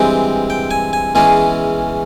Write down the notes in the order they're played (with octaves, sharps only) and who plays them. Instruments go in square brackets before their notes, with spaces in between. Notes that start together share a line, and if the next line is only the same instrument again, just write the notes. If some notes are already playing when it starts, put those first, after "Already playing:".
Already playing: [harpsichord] G2 E3 G#3 C4 G5
G5
G#5
G#5
E2 E3 G#3 C#4 G#5